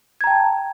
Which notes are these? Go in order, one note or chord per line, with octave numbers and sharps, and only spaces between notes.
G5 A5 A#5 G#6